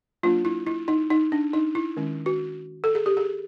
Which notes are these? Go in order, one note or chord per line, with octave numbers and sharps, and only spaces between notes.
F#3 A#3 D4 F4
E4
E4
D#4
D#4
D4
D#4
E4
D#3 G#3 C#4
F#4
A4
G#4
G4
G#4